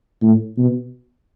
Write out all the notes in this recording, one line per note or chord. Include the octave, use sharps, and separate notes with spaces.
A2
B2